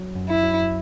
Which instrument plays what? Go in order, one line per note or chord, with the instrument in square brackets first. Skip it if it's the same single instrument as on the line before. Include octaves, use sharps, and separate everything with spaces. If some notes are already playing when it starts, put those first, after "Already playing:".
Already playing: [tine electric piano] F#3
F#2
[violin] E4
[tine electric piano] F#3